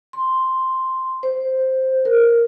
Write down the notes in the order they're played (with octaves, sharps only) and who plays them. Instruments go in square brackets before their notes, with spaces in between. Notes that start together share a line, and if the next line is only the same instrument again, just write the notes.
[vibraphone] C6
C5
A#4